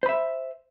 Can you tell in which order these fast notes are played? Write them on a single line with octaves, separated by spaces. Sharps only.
C5 B5 E5